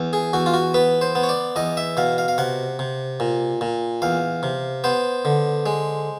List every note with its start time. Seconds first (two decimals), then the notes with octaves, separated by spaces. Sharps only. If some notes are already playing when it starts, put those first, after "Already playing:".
Already playing: E2
0.13 G#4
0.33 E2 F#4
0.46 F4
0.54 F#4
0.74 B3 B4
1.01 C5
1.15 B3
1.23 C#5
1.29 D5
1.56 E2 D#5
1.77 E5
1.97 B2 F5
2.18 F5
2.28 F5
2.38 C3 F#5
2.79 C3
3.20 A#2
3.61 A#2
4.02 E2 F5
4.43 C3
4.84 B3 C5
5.25 D3
5.66 G#3